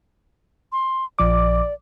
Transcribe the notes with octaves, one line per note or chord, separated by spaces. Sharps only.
C6
A#1 F3 D5 D6